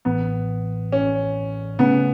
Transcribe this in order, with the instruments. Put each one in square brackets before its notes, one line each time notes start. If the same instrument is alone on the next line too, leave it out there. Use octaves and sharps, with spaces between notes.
[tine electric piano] A1 A2 E3 [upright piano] B3
[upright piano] C#4
[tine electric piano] C#3 A3 C#4 [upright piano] B3